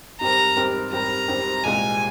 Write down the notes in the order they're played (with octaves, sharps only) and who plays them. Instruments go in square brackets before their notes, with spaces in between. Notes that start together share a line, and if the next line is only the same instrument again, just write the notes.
[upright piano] G#2 G3 C4 G4 A#4 [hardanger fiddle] A#5
[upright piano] G#2 G3 C4 G4 A#4
[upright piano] G#2 G3 C4 G4 A#4 [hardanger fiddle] A#5
[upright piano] G#2 G3 C4 G4 A#4
[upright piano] C2 A#2 G#3 [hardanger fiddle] G#5